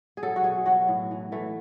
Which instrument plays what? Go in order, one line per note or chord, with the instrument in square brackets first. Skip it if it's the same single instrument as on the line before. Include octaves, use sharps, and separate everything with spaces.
[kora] G#4
F#3 A4
F#4
B2 G#4
F#3 F#4
A2
E3
E3 A3